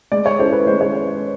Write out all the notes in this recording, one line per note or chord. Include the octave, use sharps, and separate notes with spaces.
G#3 D5
C#5
C#4 E4 A4 C5
B4
G#3 C5
C#5